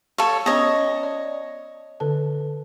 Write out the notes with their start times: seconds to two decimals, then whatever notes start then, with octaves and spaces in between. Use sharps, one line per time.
0.18 A4 C#5 F5 A5
0.46 B3 C#4 C#5 D#5
1.03 D5
2.00 D3 A4 A5